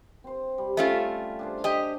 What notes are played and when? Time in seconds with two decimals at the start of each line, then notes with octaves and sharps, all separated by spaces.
0.24 C4 C5
0.58 G3
0.77 A3 C#4 F4
1.39 D4 G#4 C5
1.64 G4 D#5